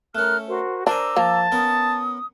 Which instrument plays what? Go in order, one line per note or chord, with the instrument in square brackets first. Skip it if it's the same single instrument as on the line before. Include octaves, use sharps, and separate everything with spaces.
[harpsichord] A3 C#4 [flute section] A#4 F6 F#6
[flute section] F#4 A#4 C5
[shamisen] D4 [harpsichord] A#4 C5 G#5 [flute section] A#5 D6 E6
[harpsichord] F3 [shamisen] A#3 [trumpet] A5
[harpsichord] B3 C#4 A#4 [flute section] D#6